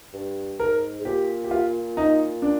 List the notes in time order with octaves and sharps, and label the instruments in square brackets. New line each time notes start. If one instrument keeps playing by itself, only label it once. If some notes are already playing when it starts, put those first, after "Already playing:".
[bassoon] G2
[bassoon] G#2 [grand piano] A#4
[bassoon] G#2
[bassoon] A#2 [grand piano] G4
[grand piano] G4
F4
D#4
D4